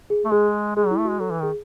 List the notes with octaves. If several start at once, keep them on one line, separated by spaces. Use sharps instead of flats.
G#4
A3
G#3 G#4
G#3 G#4
F#3 E4
A3
F#4
G#3
F#3 A4
E3
D#3 G#4